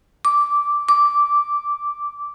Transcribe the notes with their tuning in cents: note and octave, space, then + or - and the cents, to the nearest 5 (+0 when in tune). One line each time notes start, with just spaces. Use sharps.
D6 -10
D6 -10